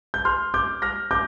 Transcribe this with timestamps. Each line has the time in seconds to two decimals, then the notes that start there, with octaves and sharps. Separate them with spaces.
0.14 G6
0.25 C6 F6
0.54 D6 G6
0.82 F6 A#6
1.11 D6 G6